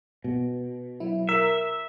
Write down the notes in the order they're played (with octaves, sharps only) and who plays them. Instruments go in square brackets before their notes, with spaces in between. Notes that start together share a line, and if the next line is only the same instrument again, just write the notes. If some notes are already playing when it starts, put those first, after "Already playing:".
[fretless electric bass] B2
[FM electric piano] F#3 E4
[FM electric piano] A#4 [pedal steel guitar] E5